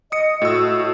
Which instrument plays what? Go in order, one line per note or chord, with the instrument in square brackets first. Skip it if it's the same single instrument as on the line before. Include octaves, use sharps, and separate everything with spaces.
[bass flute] D#5 [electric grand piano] D#6 C#7
[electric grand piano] A2 E6 [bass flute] F#4